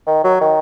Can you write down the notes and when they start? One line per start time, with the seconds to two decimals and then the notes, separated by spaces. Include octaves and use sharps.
0.07 D#3
0.24 F#3
0.41 D#3